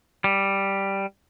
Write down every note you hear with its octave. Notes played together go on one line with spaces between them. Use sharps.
G3